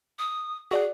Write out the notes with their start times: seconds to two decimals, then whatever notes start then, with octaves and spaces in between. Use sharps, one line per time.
0.19 D#6
0.71 F#4 G#4 D5 F#5